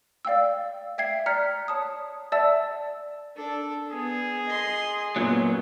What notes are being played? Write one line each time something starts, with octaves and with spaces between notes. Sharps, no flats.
D5 F5 G5 E6
E5 G5 G#6 C7
D5 A#5 F6 F#6 B6 C#7
C#5 A5 D#6
D5 E5 F#5 A5 E6
D4 A4
B3 G#4
D#5 C6
F#2 A#2 F#3 B3